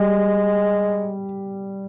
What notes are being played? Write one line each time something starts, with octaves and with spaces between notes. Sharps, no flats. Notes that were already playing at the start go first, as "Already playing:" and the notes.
Already playing: G3 G#3